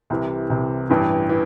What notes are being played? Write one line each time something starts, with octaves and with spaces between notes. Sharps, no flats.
C2 C3 E3
C2 C3 E3
A1 G2 E3
E3